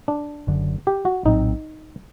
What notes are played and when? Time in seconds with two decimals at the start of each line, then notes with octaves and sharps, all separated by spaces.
0.08 D4
0.47 F#1 F#2 D3
0.87 G4
1.05 F#4
1.25 A#1 A2 F#3 C4 D#4